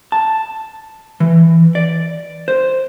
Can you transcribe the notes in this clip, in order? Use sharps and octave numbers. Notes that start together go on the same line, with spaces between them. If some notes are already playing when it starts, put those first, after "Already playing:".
A5
E3
D5
C5